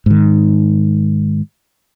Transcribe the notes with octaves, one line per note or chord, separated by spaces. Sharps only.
G#2 D#3